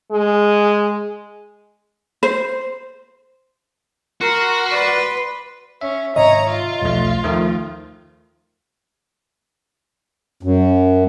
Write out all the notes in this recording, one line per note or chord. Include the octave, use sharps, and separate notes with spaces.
G#3
C5
F#4 A#4 C6
B4 D5
C#4 E5
G#2 C3 D#3 C#5 D#5 A#5
F4
B1 E2 F3 F#3 A3
D#2 D#3 F3 A3
F#2